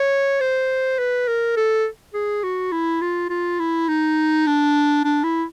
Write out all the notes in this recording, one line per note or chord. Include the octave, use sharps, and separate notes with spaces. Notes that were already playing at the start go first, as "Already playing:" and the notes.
Already playing: C#5
C5
B4
A#4
A4
G#4
F#4
E4
F4
F4
E4
D#4
D4
D4
E4